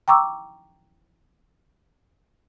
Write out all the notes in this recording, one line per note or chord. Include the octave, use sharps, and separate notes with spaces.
G5 A#5 C#6 D6 E6